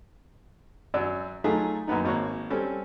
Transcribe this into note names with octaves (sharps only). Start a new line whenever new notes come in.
F#2 F#3 D5 E6
F#3 A3 D#4 F4 G#4 A4
F#2 A#3 B3 D#4
G#1 A#3 F#4 C#5
G3 C4 C#4 A4